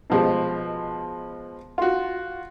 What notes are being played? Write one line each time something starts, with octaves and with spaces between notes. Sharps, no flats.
B2 F3 G#3
F4 F#4